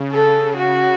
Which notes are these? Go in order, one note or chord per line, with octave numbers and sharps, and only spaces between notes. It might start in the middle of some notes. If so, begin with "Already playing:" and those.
Already playing: C#3
C#3 A4
F#4